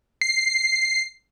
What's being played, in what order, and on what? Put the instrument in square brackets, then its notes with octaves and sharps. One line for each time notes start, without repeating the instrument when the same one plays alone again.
[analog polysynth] C7